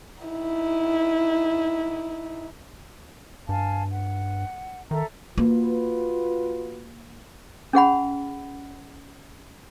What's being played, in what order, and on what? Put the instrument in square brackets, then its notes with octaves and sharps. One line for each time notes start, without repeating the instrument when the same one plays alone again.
[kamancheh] D#4 E4
[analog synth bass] G2 [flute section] F5 G#5 A5
[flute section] F#5
[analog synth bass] D#3 [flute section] A4 E5 A#5
[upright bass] A#3 [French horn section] F4 F#4 B4
[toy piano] C#4 G#4 F#5 B5